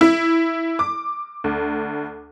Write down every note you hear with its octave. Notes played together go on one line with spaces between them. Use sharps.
E4
D6
D2